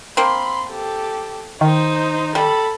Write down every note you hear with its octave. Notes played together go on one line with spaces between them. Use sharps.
A#3 C4 B5 C6
G4 A4
D#3 D#4 C5
G3 A4 B5